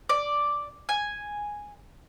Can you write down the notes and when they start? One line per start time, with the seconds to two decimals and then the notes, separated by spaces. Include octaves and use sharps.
0.09 D5
0.89 G#5